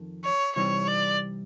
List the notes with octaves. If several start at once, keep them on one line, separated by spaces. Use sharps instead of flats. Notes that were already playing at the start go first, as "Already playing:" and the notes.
Already playing: F2 D#3
C#5
C3 E3 G3 C4 D#4 C#5
D5